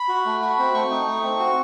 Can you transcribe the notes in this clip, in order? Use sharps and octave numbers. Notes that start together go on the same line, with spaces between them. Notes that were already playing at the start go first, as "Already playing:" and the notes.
Already playing: B5
F#4
A3
F#4 B5
C4
A3 C#6
D#4
A3
C4
F#4